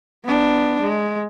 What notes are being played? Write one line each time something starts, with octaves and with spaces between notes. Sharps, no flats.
B3 D4
G#3